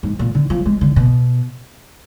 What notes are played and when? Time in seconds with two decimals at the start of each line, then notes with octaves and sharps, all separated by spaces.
0.03 G#2
0.19 A#2
0.35 D3
0.50 F3
0.65 G#3
0.81 D3
0.96 B2